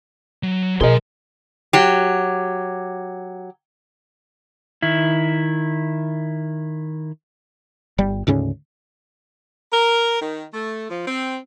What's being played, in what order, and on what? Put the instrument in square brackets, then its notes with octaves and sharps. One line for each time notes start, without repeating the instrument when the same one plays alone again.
[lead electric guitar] F#3
[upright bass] B2 [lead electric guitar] F3 C6 [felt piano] G#4 A#4 D#5
[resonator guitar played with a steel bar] F#3 G4
[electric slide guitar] D#3 E4
[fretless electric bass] G1 G3
D2 G#2 C#3 C#4
[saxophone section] A#4
D#3
A3
F3
C4